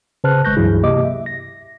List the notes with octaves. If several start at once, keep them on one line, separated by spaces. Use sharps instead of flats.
C#3 B4 C5 A5 F6 F#6
G#1 G#3 C#6 F#6 G6 A#6
C#2 G2 E3 F#3 E4 G#4
C3 A#3 G4 D#5 D6
E5
A#6